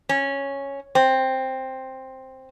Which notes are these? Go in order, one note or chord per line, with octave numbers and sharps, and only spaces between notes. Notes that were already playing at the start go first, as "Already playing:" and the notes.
C#4
C4